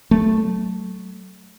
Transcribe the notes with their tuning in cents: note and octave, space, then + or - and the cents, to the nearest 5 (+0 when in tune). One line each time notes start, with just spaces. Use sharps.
F#3 +20 A3 +0